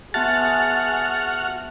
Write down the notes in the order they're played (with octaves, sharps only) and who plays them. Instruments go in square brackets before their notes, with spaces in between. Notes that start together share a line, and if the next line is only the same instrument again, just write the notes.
[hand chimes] B3 E5 A5 [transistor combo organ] F#4 F6 [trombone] G#4 [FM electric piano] A6